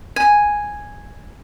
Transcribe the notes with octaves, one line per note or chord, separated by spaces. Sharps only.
G#5